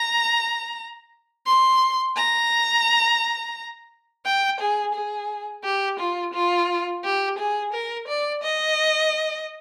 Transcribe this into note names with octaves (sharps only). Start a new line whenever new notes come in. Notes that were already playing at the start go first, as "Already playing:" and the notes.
Already playing: A#5
C6
A#5
G5
G#4
G#4
G4
F4
F4
G4
G#4
A#4
D5
D#5